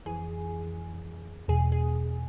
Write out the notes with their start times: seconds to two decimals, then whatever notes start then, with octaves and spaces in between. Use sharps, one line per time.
0.06 F2 E3 G#4
1.48 E2 B2 G#4
1.72 G#4